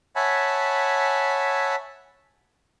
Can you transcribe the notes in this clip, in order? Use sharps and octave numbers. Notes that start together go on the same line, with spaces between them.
C#5 E5 F#5 G#5 A5 B5